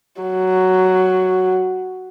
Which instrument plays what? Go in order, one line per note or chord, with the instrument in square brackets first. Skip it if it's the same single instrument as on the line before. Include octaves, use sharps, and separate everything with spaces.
[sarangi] F#3